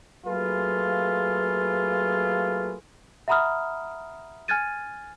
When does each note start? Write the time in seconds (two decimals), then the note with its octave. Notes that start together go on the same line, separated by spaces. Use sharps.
0.26 F#3 A3 A#3 F4 G#4 B4
3.28 E5 F#5 A#5 B5 D#6 F6
4.48 G#5 F6 F#6 G#6 A6 D#7